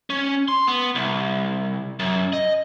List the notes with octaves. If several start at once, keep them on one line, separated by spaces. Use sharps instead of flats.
C#4
C6
B3
C2
F#2
D#5